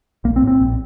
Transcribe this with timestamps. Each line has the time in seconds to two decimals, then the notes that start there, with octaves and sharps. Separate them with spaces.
0.24 A#1 A#3
0.36 C4
0.42 A2
0.47 C4
0.60 A#1